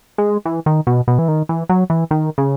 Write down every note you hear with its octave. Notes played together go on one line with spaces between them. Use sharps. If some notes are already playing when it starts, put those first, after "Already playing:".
G#3
E3
D#3
B2
B2
E3
D#3
E3
F#3
E3
D#3
C#3